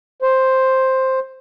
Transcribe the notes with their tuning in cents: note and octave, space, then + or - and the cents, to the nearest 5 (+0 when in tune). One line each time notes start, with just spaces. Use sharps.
C5 +5